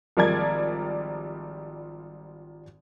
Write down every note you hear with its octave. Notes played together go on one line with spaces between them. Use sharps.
G#1 F3 G3 A#4 D5 G#6